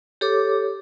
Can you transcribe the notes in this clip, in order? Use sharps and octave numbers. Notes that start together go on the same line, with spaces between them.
G4 A4 C#5 D6